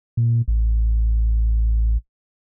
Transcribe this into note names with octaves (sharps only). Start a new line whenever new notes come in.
A#2
A1